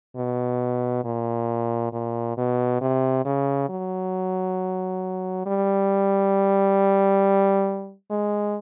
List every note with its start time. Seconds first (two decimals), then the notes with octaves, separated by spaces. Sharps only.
0.17 B2
1.05 A#2
1.93 A#2
2.37 B2
2.81 C3
3.25 C#3
3.69 F#3
5.46 G3
8.11 G#3